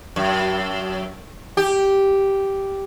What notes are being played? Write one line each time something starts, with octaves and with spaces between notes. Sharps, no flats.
F#2
G4